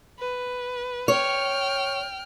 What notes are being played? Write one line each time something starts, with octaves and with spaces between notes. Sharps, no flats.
B4
C#5 G5 F6